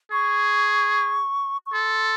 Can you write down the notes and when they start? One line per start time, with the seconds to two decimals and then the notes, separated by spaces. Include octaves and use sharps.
0.12 G#4 C#6
1.66 C#6
1.73 A4 C6